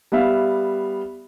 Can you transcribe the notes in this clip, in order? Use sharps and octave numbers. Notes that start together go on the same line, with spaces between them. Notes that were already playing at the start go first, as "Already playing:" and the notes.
G3 B3 E5 F5